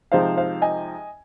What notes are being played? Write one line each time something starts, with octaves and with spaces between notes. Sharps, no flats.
C3 F3 G#3 D#4 C5 F5
C5 F5
D#5 G#5